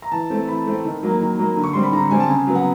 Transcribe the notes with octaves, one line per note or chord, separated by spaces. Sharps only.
A#5
E3 A5
A3 C4
E3 B5
A3 C4
D#3
F#3 A#3
D#3
F#3 A#3
D3
C#6
G3 C4 C6
B5
D3 A#5
G3 C4 G#5
A5
C#3 G#5
F#3 B3
F#5